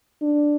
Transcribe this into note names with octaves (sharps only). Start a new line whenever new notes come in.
D4